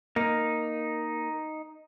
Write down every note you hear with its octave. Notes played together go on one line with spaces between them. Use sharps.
A#3 D#4